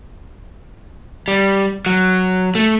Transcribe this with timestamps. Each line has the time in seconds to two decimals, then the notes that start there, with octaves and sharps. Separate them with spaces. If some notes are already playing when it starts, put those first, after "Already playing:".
1.28 G3
1.86 F#3
2.55 A3